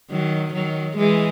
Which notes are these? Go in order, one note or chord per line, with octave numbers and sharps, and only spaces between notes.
D#3 F#3
D#3 F#3
E3 G#3